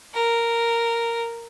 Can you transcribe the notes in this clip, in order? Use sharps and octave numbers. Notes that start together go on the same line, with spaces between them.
A#4